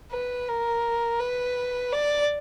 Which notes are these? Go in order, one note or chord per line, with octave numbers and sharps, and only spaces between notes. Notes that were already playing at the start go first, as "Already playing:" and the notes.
B4
A#4
B4
D5